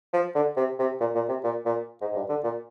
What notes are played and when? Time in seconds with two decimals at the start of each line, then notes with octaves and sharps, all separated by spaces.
0.13 F3
0.35 D3
0.57 C3
0.79 C3
1.00 A#2
1.15 A#2
1.29 C3
1.44 A#2
1.66 A#2
2.02 G#2
2.12 G#2
2.15 G2
2.29 D3
2.44 A#2